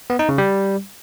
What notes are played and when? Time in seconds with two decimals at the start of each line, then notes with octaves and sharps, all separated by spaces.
0.10 B3
0.19 D#4
0.29 C#3
0.38 G3